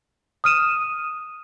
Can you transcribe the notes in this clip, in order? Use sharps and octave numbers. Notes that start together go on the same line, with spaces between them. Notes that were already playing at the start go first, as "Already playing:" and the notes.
D#6 F6 D#7 E7